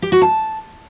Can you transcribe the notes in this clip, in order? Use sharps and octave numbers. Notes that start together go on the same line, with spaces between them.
G4
F#4
A5